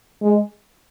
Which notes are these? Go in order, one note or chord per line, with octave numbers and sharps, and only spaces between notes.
G#3